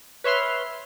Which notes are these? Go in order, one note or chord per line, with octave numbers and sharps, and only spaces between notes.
B4 C#5 E5 C6 F6